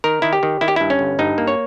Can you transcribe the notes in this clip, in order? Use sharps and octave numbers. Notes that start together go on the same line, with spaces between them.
D#3 A#4
D#3 E4
G4
D#3
D#3 E4
G4
G2 E4
C#4
G1
G2 D#4
A#3
C#5